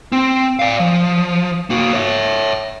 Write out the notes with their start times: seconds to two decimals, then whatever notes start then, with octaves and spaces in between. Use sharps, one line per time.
0.12 C4
0.59 D5 F5
0.80 F3
1.70 A#3 F#4
1.93 C#5 E5